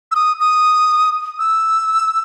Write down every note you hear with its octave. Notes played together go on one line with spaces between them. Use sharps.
E6
D#6
D#6
E6